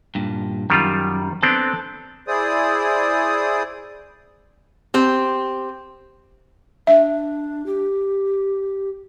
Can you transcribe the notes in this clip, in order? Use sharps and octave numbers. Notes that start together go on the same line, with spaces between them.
G2 A#2
F#2 D#3 G3 F4
B3 C4 D4 A4
E4 G#4 C5 D5 D#6
C4 G4
D4 E5
G4